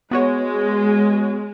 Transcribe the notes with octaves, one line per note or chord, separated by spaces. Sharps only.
G#3 B3 F#4 C#5